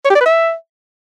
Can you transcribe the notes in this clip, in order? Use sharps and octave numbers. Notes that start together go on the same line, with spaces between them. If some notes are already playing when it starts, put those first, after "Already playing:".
C#5
G4
D5
B4
E5